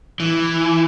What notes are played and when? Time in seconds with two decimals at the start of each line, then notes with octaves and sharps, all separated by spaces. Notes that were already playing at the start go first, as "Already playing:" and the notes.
0.20 E3